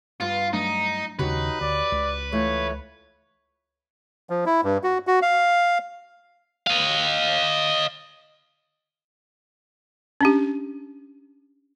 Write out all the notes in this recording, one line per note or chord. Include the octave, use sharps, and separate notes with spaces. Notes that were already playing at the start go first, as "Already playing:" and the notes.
G2 B3 F4
F#3 A3 D4 D#4
D#2 C#3 D#4 F#4 G4 B4 C#5
D2 D5
C#2
E3 A3 F4 C#5
F3
E4
G2
F#4
F#4
F5
D#5 F5
C#4 D4 G4